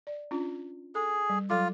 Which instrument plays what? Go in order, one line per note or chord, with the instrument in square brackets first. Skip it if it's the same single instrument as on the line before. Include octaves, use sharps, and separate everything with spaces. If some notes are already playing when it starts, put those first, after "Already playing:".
[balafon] D5
C#4 D4 F4
[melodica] G#4 [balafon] A4
[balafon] G3
[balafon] F#3 A4 D6 [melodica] F4